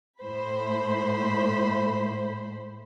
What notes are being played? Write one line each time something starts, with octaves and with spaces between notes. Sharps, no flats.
A2 C5 B5